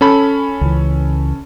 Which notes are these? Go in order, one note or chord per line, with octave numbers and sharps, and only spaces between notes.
C#4 A4 B5
C#2 E3